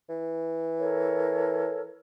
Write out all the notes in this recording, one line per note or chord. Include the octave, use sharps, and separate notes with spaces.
E3
A4 A#4 C#5